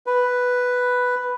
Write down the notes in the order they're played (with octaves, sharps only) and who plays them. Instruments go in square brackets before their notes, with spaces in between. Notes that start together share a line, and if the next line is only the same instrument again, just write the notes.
[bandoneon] B4